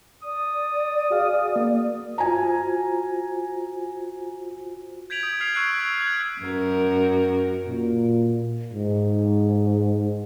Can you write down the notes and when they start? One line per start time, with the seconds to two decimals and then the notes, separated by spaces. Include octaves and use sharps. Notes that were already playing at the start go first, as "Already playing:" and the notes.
0.23 D5 D#6
1.10 F#4 G#4 F5
1.56 A#3
2.18 F4 F#4 C5 G#5 A#5
5.10 G6 G#6 B6 D7 F7 F#7
5.23 D#6
5.41 F6 G#6 B6 C7 D7 F7
5.54 C#6 E6 F#6 C7 D7
5.80 G#6
5.99 F#6 G#6 D7
6.42 F#2 F#4 A#4
7.67 A#2
8.73 G#2